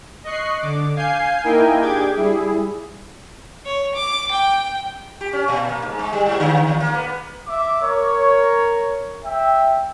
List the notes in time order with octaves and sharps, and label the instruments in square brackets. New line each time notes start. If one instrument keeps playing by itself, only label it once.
[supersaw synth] D#5 C#6 F#6 C7
D3 D6
F5 G#5 G6 G#6 C7
A#3 D#4 E4 A#4 G5 G#5
D4 G4 G#4 G5 D6 G#6
G3 E4 G#4
[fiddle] C#5
D6
G5
[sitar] G4
C#4
A#2
A#3
G#2
G#3
G3
G#2
D3
E2
A#3
B3
[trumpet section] E5 D6
A#4 C#5
E5 G5